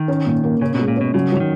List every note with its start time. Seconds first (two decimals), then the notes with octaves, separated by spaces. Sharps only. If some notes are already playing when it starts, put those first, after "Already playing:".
Already playing: D#3
0.08 C#4
0.26 A#2
0.44 A#3
0.61 C#3 C#4
0.75 B2 G#3
0.88 A#2
0.97 B2 C#4
1.14 C#3 F#3
1.32 E3 F#3
1.40 D#3